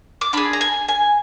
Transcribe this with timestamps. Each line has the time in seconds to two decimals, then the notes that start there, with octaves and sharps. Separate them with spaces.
0.21 D6
0.33 D4 G#4 B5
0.53 A#5
0.61 G#5
0.88 G#5